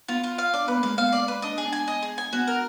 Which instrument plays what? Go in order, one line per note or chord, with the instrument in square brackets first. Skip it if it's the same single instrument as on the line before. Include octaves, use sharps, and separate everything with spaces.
[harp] B3 [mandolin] F4
[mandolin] F4
F5
[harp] D4 [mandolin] D5
[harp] B3 [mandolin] B4
[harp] A#3
[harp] G#3 [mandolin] F5
[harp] B3 [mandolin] F5
[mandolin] D5
B4
[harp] D4 [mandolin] D#5
[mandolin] G#4
[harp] D4
[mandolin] G#5
D#5
G#4
G#5
[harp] B3 [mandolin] F#4
[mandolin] A#4